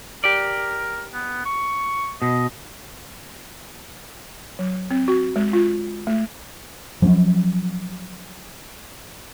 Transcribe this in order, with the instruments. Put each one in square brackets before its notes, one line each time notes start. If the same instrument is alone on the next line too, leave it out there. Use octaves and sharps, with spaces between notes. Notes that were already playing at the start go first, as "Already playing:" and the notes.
[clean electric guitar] G4 D5 [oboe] A#4
[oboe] B3
C#6
[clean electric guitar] B2 [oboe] D#5
[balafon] F#3
C4
F#4
G#3
F4
A3
[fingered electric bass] F3 F#3 A#3 C#4